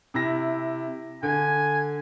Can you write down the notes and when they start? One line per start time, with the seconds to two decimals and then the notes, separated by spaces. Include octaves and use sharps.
0.14 C3 E4 A#6
1.23 D3 G#5